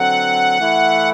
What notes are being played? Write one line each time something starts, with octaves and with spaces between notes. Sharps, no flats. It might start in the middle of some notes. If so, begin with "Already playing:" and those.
Already playing: D3 F#3 C4 F#5
E3 A3 E4